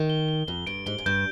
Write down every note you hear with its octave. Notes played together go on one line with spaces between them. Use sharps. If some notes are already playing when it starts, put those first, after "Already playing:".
Already playing: D#3
G7
G7
F2 G7
G2 D7
G#2 G7
G#2
G2 G6